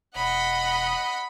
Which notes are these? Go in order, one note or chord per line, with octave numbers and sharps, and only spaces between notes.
E1 D#5 F#5 B5